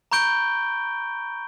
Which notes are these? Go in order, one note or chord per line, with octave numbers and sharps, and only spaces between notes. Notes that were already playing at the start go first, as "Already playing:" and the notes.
A#5 B5 C#6 G6 D7 G7